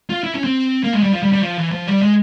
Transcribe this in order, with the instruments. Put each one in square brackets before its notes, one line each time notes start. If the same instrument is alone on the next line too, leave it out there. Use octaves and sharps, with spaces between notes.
[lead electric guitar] F4
E4
C#4
C4
A#3
G#3
G3
F3
G3
G3
F3
E3
F3
G3
G#3